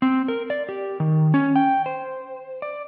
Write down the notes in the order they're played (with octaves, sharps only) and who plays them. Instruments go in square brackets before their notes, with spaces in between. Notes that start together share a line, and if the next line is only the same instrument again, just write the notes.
[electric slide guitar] C4
A#4
D5
G4
D#3
C#4
G5
C5
D5